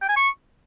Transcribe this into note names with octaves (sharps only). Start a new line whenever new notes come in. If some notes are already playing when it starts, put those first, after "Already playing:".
G5
G#5
C#6